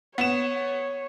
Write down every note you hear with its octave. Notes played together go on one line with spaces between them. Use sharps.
B3 C#5 E7